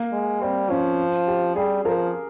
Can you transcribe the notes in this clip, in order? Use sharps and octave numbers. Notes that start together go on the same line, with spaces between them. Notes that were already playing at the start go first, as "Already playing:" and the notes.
Already playing: A#3
G#3
G3 C4
F3 C#4
G4
G3 G#4
F3 A#4